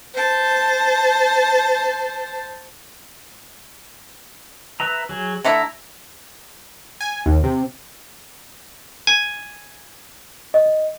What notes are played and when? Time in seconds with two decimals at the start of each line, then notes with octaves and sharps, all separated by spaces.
0.15 C5 A5
4.80 B4 E5 A#5
5.09 F#3 G#4
5.45 D3 A3 E4 A#5
7.01 G#5
7.26 D#2
7.43 C3
9.07 G#5
10.54 D#5